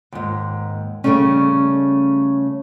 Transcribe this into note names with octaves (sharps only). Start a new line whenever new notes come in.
D#2 G#2
C#3 E3 G3 A3 C#4